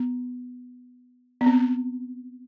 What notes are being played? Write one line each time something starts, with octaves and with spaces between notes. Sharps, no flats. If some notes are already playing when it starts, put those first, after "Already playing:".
Already playing: B3
B3
C4